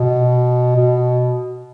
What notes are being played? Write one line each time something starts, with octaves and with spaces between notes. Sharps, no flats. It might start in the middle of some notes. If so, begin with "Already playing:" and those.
Already playing: B2
B2